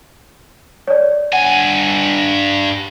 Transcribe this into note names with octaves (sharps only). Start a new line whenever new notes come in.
C#5 D5
G2 F#5 G#5